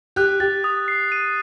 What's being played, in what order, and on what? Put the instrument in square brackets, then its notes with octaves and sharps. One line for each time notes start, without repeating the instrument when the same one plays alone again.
[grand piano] G4 [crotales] F#6
[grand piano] G4 [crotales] A6
[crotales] D#6
C7
D#7